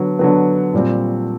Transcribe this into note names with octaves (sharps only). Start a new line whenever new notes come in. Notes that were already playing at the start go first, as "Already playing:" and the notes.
Already playing: D3 F#3 B3
D3 F#3 B3
A#2 G3 C4